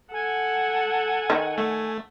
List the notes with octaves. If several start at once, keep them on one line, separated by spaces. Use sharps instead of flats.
A4 F#5 G#5
D#3
A3